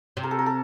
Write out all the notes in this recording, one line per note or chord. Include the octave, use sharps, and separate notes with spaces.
C3
A#4
A4
A#4
A4